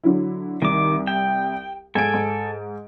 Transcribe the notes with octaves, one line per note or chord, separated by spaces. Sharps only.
D3 F#3 E4
C2 D#3 D6
G5
G#2 A4 G#5 D7
G#2